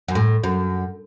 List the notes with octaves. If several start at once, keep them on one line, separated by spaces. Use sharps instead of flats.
F#2
A2
F#2